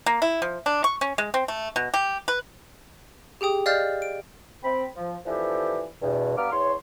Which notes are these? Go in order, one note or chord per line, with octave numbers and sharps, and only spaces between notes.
A#3
E4
F3
D4
C#6
C#4
G#3
C4
A3
B2
G4
B4
G4 G#4 G5 D#6
D5 D#5 F5 F6 G6 A6
D7
C4 B5
F3
E3 F3 B3 D4 G4 A4
E2 G2 B2
G2 B3 F5 A#5 D6 F6
E2 C#5 C6